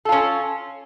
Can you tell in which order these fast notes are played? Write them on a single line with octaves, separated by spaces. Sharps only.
A4 F4 C#4